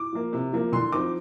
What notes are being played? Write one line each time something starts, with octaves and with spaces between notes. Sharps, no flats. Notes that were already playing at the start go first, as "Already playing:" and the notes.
Already playing: D6
F3 A#3
C3
F3 A#3
D3 C6
F3 C4 D#4 D6